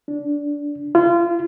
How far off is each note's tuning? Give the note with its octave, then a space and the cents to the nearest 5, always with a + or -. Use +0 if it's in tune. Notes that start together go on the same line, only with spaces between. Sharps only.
D4 -15
F4 -30